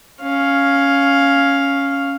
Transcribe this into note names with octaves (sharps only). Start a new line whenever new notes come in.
C#4 F5